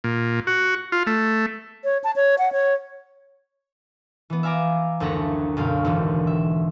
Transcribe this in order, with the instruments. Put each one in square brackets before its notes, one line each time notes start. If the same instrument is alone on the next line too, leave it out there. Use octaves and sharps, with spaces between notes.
[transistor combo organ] A#2
F#4
F4
A3
[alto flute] C#5
A5
C#5
F#5
C#5
[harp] E3 B3
E5 F5 G#5 A#5 D6
F#1 D2 A4 F#5 A#5 B6
B1 F#2 D3 F5
G#1 D#2 D3 E3
E5